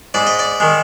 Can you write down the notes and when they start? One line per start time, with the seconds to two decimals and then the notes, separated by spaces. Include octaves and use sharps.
0.14 G#2 D5
0.27 D#5
0.39 D5
0.60 D#3 G#3